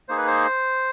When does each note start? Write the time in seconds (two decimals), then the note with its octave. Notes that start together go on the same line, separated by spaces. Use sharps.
0.09 A#3 D#4 G#4 C5
0.18 B4
0.27 C5